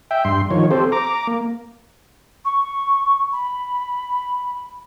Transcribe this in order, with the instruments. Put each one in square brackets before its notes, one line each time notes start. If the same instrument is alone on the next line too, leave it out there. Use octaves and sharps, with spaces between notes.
[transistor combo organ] E5 G5
G2 C6
D#3 F3 C#5
C4 G4 A4 C5
A#5 D6
A#3
[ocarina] C#6
B5